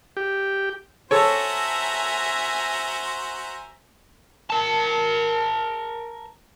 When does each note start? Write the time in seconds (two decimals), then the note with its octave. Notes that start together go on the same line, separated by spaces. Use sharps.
0.17 G4
1.11 F#4 A4 C5 C#5 E5 G#5 A#5
4.50 A#4 A5